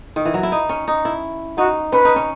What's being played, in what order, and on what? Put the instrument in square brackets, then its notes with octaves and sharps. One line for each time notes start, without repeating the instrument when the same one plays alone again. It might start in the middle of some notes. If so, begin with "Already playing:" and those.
[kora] D#3
E3
F#3
E4
D#4
C#4
D#4
E4
[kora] D#4 [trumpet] F#4
[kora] C#4 [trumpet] B4
[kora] D#4
C#4